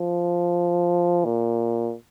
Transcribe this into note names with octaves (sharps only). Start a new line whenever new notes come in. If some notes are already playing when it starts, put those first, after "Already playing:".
Already playing: F3
A#2